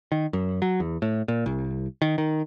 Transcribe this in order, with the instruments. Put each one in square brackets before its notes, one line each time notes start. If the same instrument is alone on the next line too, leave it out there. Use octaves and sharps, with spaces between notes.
[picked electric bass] D#3
F#2
F#3
E2
A2
A#2
C2
D#3
D#3